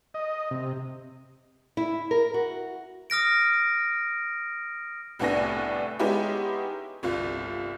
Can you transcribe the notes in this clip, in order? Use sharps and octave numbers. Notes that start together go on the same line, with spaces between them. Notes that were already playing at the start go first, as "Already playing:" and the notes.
D#5
C3
E4
A#4
F#4
D#6 F6 A#6 D7
C2 A2 B3 D4 G#5 A#6
G#3 B3 C#4 D#4 E4 G4
G1 C2 F4